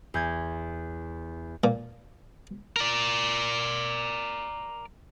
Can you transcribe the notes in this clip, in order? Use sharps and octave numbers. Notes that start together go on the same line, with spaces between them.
E2 G6 G#6
A#2
A#4 D5